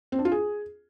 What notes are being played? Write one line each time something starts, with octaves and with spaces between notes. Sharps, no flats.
C4
D4
F4
G#4